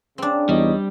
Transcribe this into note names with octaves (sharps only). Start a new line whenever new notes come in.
C#3 C4 D4
E2 G3 D#4 C#5 D#5